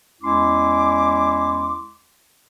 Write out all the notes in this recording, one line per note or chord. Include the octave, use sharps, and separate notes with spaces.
E2 G#3 C#4 E4 C6 D6